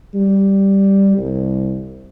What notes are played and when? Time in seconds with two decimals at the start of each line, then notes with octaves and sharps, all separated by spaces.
0.14 G3
1.18 C2